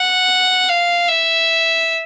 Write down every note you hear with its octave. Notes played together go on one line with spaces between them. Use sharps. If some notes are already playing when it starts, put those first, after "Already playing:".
Already playing: F#5
F5
E5